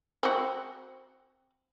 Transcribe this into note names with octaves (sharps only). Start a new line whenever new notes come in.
C4 F#4